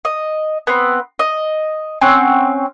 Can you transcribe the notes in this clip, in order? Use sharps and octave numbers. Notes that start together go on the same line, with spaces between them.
D#5
B3 C4
D#5
C4 C#4 F#5